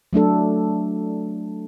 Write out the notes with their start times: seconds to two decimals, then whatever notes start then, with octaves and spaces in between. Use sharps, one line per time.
0.13 F#3 A3 D4 A4